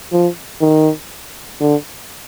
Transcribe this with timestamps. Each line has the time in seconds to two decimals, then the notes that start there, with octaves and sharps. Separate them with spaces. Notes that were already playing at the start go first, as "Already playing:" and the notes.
0.12 F3
0.61 D#3
1.60 D3